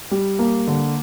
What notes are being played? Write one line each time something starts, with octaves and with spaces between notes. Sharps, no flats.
G3
A#3
D3